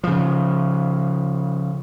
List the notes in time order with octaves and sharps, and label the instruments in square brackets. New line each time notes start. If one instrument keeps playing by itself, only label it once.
[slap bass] C#3 F3